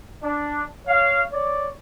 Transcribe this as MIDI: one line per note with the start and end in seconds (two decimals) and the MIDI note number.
0.22 0.63 62
0.87 1.21 73
0.87 1.21 77
1.33 1.70 73
1.33 1.70 74